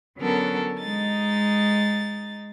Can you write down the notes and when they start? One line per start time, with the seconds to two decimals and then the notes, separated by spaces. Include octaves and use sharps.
0.18 D3 F#3 B3 C#4 A4 A#4
0.80 G#3 D#4 A6